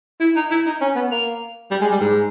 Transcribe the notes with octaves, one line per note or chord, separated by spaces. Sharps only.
E4
D#4
E4
D#4
C#4
B3
A#3
G3
G#3
G3
G#2